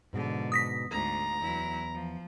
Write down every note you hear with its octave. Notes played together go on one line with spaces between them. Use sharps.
G#2 B2 D3 F3 G#3
D#6 A#6 B6
D2 G#2 A3 A#5
E2 F#3 E4
F3